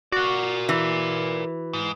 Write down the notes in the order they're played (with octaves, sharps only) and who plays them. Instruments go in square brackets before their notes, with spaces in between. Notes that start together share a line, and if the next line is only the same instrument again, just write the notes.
[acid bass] F#4 [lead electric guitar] A#4 D5
[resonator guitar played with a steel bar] E3
[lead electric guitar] G#2